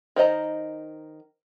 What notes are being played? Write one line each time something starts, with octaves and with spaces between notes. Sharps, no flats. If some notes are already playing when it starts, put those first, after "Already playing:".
D#3 C5 D#5 A#5